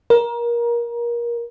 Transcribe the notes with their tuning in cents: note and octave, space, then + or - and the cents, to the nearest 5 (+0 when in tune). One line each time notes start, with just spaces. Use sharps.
A#4 +25